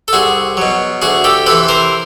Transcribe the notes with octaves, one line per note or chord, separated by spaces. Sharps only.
A4
C2 F#4 G#4
B2 F#3
D2 F#4 G#4
G4 A4
C3 E3 A4 B4
A#4 C5